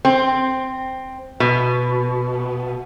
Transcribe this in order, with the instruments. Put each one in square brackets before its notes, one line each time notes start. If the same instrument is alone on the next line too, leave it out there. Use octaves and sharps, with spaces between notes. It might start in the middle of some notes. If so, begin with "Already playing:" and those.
[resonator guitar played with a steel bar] C4
B2